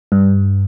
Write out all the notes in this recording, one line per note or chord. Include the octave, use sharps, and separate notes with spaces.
G2